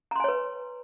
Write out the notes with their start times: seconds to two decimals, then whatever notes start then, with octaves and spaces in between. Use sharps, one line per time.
0.11 A#5
0.16 C6
0.20 G#5
0.24 C#5
0.28 B4